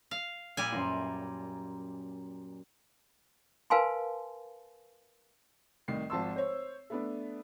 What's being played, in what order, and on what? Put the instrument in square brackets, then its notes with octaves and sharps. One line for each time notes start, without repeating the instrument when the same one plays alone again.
[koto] F5
A#2 G3 G#5
[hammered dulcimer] F#2 A#5 C6
[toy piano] A#4 B4 F5 G#5 A5 C6
[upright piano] C2 A2 D#3 C7
G#1 F3 A5 C6 E6
C5 C#5
A3 B3 D4